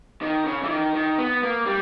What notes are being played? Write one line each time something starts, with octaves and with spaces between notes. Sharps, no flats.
D#3
C#3
E3
D#3
D#3
B3
A#3
G3